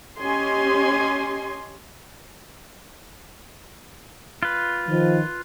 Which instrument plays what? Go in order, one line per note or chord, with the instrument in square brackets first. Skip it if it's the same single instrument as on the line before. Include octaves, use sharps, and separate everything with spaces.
[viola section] C#4 G4 D#5 G#5 C6
[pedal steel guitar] F4 B4
[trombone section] D#3 F3